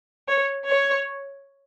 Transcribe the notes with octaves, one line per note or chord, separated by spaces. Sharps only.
C#5
C#5